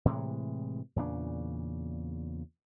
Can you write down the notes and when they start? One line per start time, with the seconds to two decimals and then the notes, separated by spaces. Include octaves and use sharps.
0.05 A2 C3 E3 G#3
0.96 E2 A#2 C#3 D4